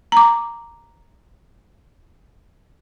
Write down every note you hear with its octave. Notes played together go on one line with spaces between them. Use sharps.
A#5 D6